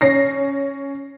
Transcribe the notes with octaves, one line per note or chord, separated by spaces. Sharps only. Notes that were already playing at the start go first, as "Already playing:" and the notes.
C#4 A#6 C7